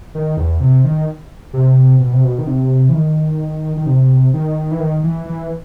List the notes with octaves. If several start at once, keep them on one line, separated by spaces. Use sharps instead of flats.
D#3
E2
C3
D#3
C3
B2
C3
B2
D#3
C3
E3
D#3
D#3
C3
D#3
E3
D#3
E3
E3